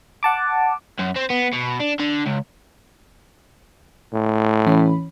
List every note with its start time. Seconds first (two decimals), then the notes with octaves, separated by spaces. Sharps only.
0.23 F#5 A5 D6
0.99 F#2
1.16 C4
1.30 B3
1.53 B2
1.80 D4
2.00 D3
2.26 C#2
4.13 A2
4.66 E3 C#4 B5